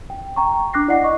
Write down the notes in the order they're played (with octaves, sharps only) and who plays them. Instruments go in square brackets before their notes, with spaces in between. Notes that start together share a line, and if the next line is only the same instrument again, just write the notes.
[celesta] G5
G5 A#5 C#6
D4 D6 F#6 A#6 C7
E4 D5 D#5 F#5 C7
D#5 C#6 D6